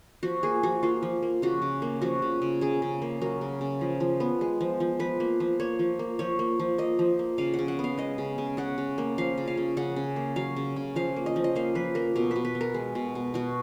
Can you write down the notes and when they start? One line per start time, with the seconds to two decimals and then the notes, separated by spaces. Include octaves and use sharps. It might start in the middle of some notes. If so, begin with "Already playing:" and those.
0.23 F3 F#4
0.43 A#3 G#4
0.63 F3 F#4
0.83 A#3 F4
1.03 F3
1.22 A#3
1.42 C#3 F#4
1.62 C#3
1.82 A#3
2.02 F3 F#4
2.22 C#3
2.42 C#3
2.61 C#3 G#4
2.82 C#3
3.02 A#3
3.21 F#3 A#4
3.41 C#3
3.61 C#3
3.81 F3
4.00 F3
4.20 B3
4.41 G#3
4.61 F3
4.80 F3
4.99 F3 B4
5.20 A#3
5.40 F3
5.60 A#3 C#5
5.79 F3
5.99 A#3
6.19 F3 C#5
6.39 A#3
6.60 F3
6.78 A#3 D#5
6.99 F3
7.19 A#3
7.38 C#3 F5
7.54 F#5
7.59 C#3
7.68 F#5
7.79 B3
7.84 F5
7.98 G#3 D#5
8.18 C#3
8.38 C#3
8.57 C#3 F#5
8.78 C#3
8.98 A#3
9.18 F3 F5
9.38 C#3
9.47 F5
9.57 C#3
9.77 C#3 F#5
9.96 C#3
10.16 A#3
10.36 F#3 F5
10.56 C#3
10.76 C#3
10.96 F3 F5
11.16 A#3
11.26 D#5
11.36 F3
11.44 D#5
11.55 A#3 F5
11.75 F3 B4
11.95 A#3 A#4
12.16 B2 A#4
12.31 B2 B4
12.45 B4
12.55 B3
12.61 A#4
12.74 G#3
12.95 B2
13.15 B2
13.34 B2 F#4